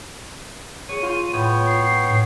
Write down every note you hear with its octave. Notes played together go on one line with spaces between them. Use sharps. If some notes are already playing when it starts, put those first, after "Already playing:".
G#4 C#5 D#7
F4 F5 C6 G6
A2 B3 C#5 G5
C7
A2 C7